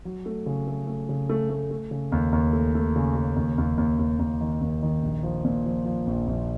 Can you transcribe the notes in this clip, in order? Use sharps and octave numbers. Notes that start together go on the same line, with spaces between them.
F#3
A3
C#3
A3
A3
C#3
A3
A3
A3
C#3
D#2
D#2
A3
A3
C#3
C#3
D#2
D#2
D#2
D#2
D#2
D#3
D#2
D#3
A#1
F3
A#2
F3
F3
A#1
A#1